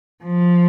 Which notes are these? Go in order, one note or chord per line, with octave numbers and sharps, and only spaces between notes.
F3